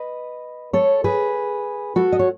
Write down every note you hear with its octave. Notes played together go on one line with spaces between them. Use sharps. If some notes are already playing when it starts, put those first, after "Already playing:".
Already playing: B4 D#5
A4 C#5
G#4 B4
F#4 A4
D#5
C#5